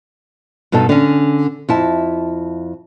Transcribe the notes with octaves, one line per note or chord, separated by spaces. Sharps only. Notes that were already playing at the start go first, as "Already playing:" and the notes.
G2 B2 D#4 A4 A5
D3 C#4
F2 E4 A5